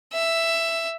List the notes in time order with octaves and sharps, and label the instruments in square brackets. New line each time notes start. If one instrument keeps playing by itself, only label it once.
[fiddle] E5